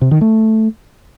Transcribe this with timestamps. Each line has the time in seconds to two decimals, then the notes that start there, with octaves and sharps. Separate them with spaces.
0.01 C3
0.11 D#3
0.21 A3